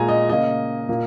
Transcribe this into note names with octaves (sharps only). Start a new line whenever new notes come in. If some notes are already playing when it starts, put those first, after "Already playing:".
Already playing: A#2 G#3 G#5 A#5
D#5
C#3 A#3 D#5
A#2 A#3